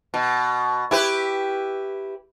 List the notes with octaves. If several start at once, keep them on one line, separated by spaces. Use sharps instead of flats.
B2
E4 G4 B4